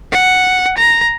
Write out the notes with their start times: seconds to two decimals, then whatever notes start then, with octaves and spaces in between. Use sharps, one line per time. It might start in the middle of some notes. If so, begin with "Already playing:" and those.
0.12 F#5
0.77 A#5